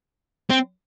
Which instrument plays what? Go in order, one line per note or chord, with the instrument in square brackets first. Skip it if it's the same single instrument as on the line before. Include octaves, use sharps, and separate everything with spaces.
[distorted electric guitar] C4